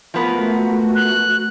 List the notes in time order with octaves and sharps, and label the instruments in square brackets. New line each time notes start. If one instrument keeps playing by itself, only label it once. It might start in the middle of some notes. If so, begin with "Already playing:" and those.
[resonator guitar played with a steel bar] F3 B3 A#4 [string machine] A3 F#4
[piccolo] F#6